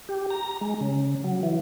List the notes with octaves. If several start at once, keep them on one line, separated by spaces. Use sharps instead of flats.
G4
A#5
G#3
C#3
F#3
E3